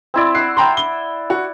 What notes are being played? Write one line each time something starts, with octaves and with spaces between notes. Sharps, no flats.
C4 E4 D5
F#5 B5 E6 C7
G5 A#5 C6
G7
F#4